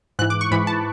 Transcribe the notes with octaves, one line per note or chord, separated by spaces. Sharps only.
G#2 E3 F#6
D6
C#6
G#2 E3 B5
A5